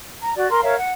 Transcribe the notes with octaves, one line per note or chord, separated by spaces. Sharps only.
A#5
F#4 D5
A#4 A#5 C6
A#4 C#5 E5 F5
F#5